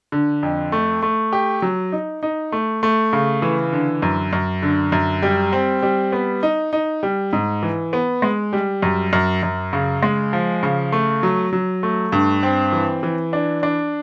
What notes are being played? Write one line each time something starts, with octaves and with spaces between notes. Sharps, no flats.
D3
F2
A3
A3
G4
F#3
D#4
D#4
A3
A3
C#3
E3
D3
F#2
F#2
D3
F#2
G3
C4
G3
B3
D#4
D#4
G3
G#2
E3
B3
G#3
G3
F#2
F#2
F#2
C#3
G#3
F3
C#3
A3
F#3
F#3
A3
G2
C4
E3
E3
D4
D4